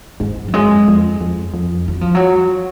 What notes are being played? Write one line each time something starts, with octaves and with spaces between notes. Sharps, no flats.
G#2 G#3
F#3
F#2 G#3
F2
F2
F2
F#3
F3
F#3